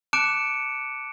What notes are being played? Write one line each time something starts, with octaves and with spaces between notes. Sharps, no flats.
A5 D6 F#6 C#7 D7 E7